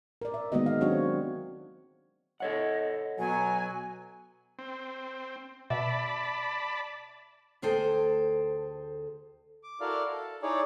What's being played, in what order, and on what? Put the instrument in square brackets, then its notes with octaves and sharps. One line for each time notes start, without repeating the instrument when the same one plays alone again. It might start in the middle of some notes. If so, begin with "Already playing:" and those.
[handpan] A#4 D5
E5
D#3 G#3 A#3 B3 F#4 D#5
F5
F#3 C4 D4 F#4 C#5
[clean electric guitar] A4 C#5 F#5 [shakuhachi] D#5
[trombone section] B2 F#3 [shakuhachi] G#5
[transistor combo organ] C4
[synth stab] B2 [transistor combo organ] D5 A5 B5 [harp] E5
[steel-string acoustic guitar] D2 G#4 A4 C5 G5
[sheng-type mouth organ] D6
E4 F#4 A4 A#4 D5 F5
A4
D#4 E4 G#4 C#5 D5